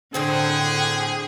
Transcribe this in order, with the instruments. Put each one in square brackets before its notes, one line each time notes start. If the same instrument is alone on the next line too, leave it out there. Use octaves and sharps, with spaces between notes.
[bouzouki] A2 C4 C5 [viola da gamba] D3 [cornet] G#4 [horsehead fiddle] G5